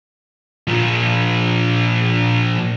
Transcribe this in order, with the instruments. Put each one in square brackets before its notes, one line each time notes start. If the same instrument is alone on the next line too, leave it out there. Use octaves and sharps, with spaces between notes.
[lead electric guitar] A#2 F3